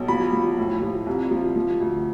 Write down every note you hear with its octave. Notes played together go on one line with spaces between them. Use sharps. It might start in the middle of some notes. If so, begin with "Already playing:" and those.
Already playing: B1
F3 B5
F3
A2
F3
C2
F3
F3
D2